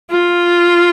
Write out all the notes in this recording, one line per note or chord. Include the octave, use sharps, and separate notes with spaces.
F4